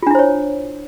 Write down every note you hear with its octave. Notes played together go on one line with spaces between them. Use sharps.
D4 E4 F4 C5 C#5